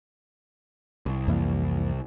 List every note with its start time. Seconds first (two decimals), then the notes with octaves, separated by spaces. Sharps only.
1.06 C2
1.28 F2 E3 A#3